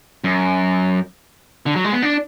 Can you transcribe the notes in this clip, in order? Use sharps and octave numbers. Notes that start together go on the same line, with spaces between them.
F#2
D3
F#3
G#3
B3
D4